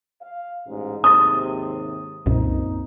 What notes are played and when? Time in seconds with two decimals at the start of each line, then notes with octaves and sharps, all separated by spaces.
0.22 F5
0.67 A1 G#2
1.04 D#2 G#2 C3 C6 D#6 A6
2.26 C2 F#2 A#2 A#3 C4 D#4